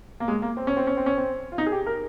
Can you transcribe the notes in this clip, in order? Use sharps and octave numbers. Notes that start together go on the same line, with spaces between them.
A#3
G#3
A#3
C4
C#4
C4
C#4
C4
C#4
C4
F4
D#4
G#4
G4
A#4